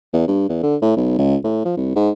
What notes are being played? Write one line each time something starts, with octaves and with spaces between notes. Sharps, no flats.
E2
G2
E2
D3
A2
B1
C#2
A2
F3
C2
G#2